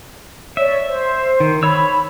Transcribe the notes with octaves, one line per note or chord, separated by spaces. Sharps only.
C#5 D5 E5
C5
D#3
C#5 B5 E6